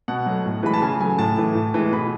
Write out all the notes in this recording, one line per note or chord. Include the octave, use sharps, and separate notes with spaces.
B2 F#5
F#3 A3
A2
E3 G#3 B5
A5
C#3 G#5
F#3 A3 G#5
A2 A5
E3 A3
A2
E3 G#3
B2 B5